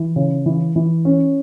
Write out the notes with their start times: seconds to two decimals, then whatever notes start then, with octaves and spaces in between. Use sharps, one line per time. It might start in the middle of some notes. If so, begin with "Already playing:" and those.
Already playing: E3
0.16 C#3
0.46 E3
0.76 E3
1.05 C#4